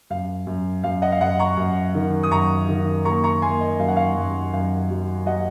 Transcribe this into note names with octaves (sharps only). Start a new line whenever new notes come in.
F#2 F5
F#2
F#2 F5
D#5 F#5
F5
F#2 D#5 F#5
A#5 C#6
F#2
D#3
D#6
F#2 A#5 C#6
D#3
A#3 A#5 C#6
A#5 C#6
A#3 G#5 C6
D#5
F#2 F5
F#5
F5
F#2
F#2 F5
F#3
F#3 D#5 F#5